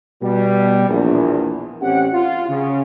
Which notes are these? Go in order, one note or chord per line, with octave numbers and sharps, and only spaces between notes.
B2 G3
A#1 E2
A1 C4 C#4 G4 F#5
F4
C#3